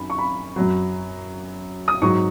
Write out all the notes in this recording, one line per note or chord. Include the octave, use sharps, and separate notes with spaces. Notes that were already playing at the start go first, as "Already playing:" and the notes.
Already playing: F#2 D#3 B5
C#6
B5
F#2 F#3
D#6
G#2 F#3 C#6